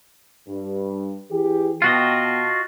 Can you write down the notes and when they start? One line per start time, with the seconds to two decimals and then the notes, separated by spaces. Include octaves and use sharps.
0.47 G2
1.30 E3 G4 G#4
1.82 B2 F4 F#4 D#5 G5 A5